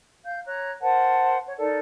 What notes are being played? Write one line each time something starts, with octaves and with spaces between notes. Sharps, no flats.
F5 G6
C#5 A#5 F#6
A#4 C5 F#5 A5
C#5
D#4 A4 A#4 D5